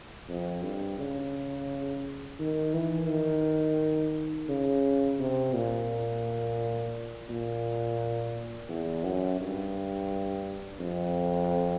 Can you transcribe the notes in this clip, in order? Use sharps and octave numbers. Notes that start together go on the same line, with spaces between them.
F2
G2
C#3
D#3
E3
D#3
C#3
C3
A#2
A#2
E2
F#2
G2
F2